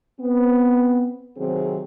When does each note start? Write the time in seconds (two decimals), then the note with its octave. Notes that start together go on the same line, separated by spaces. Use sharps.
0.20 B3 C4
1.37 C3 D#3 F#3 C4 G#4